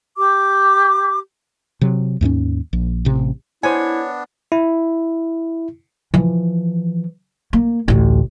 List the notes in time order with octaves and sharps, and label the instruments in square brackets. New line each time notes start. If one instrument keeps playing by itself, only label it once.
[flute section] G4 D6
[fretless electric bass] C3 F#3
D#2 G#2 A3 C#4
A#1
A1 C3
[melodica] B3 D4 [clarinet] E4 [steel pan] C5 G#5 [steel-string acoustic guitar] C#5
[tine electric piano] E4
[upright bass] E3 F3
A#3
A1 D2